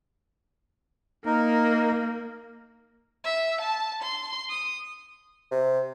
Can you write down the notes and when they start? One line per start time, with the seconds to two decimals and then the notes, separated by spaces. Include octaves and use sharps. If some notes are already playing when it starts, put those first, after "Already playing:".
1.26 A#3 D#4 A#4
3.24 E5
3.61 A5
4.02 C6
4.50 D#6
5.51 C3